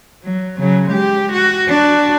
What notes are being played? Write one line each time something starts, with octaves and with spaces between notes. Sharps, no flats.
F#3
C#3 F#3
G#3 G4
F#4
D4 F#4